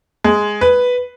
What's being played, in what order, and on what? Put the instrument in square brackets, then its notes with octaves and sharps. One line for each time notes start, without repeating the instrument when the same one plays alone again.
[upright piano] G#3
B4